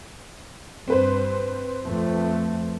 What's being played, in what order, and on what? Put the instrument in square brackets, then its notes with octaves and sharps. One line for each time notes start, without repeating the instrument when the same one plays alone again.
[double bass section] G2 [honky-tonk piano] C4 B4 C5
[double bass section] F2 A3